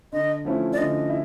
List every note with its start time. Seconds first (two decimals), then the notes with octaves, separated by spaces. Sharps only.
0.12 D3 D#5
0.45 F3 A3 C#4 E4
0.73 D5
0.78 D3 D#5
1.09 E4